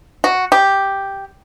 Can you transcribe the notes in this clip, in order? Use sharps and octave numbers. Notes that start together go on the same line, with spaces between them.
F#4
G4